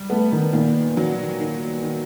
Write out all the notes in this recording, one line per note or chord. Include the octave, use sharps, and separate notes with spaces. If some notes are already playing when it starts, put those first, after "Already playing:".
Already playing: G3
A3 B3
D#3
A#2 D#3
F#3
D#3
D#3